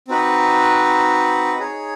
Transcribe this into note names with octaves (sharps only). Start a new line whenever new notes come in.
C4 D#4 F#4 B4
D#4 G#4 C#5